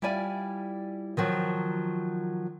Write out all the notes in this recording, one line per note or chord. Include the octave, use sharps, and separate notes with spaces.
G3 E4 F4 D5 G#5
D#3 F3 F#3